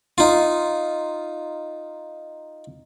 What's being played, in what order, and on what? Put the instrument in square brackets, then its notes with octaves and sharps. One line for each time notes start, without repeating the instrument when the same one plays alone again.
[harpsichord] D#4 F4